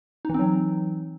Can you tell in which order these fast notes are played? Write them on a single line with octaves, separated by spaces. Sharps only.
D#4 E3 C4 F#3